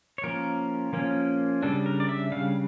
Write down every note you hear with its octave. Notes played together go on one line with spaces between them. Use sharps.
C#5
F3 A#3 C#4 A#4
F3 A#3 C#4
C#3 G3 D4 A4
A#4
D5
E5
C#3 G3 D4 F5